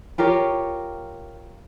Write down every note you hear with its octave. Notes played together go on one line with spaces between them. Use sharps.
F4 G4 A#4 C#5